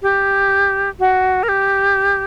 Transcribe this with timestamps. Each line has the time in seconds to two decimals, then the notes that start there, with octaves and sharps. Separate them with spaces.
0.02 G4
1.00 F#4
1.43 A#4
1.49 G4